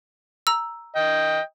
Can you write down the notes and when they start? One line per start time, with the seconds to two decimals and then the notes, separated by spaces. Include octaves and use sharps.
0.47 A#5 E6
0.96 D#5 G5